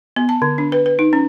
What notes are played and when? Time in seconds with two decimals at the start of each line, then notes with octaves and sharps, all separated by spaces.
0.16 B3
0.29 A5
0.42 D3
0.58 D4
0.72 B4
0.86 B4
0.99 D#4
1.13 C#4